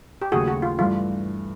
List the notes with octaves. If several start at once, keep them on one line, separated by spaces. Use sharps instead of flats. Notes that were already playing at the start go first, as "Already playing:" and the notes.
G4
D#2 C#3 F#3 A3 F#4 G#4
F#4
F4
G2 E3 A3 F4